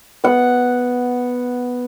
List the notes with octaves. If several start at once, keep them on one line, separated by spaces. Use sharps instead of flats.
B3 F#5